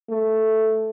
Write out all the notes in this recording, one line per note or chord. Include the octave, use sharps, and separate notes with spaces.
A3